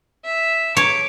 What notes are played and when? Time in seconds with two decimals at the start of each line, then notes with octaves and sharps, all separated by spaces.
0.25 E5
0.77 C#5 D6